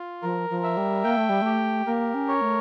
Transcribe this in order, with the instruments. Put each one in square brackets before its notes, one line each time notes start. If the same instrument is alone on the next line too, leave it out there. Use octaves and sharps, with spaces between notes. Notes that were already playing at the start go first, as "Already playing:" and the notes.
Already playing: [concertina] F4
[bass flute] F3 [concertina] A#4
[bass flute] F3
[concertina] E5
[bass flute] G3
[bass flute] A#3 [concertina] G5
[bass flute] A3
G3
[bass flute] A3 [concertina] G4
[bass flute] A#3 [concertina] A#4
[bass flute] C#4
[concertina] C#5
[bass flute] A3